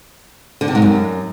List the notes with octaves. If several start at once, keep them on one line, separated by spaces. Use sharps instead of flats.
D3
C3
G#2
F#2